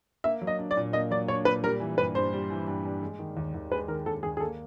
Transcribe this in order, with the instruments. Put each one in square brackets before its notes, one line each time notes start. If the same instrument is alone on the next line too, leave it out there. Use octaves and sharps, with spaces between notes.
[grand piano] A#3 [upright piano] E5
[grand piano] F#3
[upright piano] D#5
[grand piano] D4
[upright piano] D5
[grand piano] A#2
[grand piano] A#3 [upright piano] D#5
[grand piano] F#3 [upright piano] D5
[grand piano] D4 [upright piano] C#5
[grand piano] A#2 [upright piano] B4
[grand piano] G3 [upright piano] A#4
[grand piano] E3
[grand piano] G2 [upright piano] B4
[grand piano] G2 [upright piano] C5
[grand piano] G3
E3
G2
G2
G#3
D#3
D#2
D#2
[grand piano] G#3 [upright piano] B4
[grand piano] D#3 [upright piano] A#4
[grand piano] D#2 [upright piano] A4
[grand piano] D#2 [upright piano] G#4
[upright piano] G#4
[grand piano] A#3 [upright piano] A4